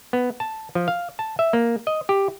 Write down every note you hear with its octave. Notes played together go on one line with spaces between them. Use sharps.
B3
A5
F3
F5
A5
E5
A#3
D#5
G4